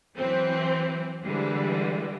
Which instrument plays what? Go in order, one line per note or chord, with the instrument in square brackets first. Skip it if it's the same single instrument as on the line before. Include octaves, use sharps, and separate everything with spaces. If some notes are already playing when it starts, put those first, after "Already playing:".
[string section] E3 F#3 C4
D3 E3 G3 G#3